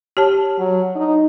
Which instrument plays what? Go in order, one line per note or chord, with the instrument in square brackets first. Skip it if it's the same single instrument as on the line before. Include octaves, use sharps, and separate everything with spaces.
[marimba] G4 C#5 A5
[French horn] F#3
D#4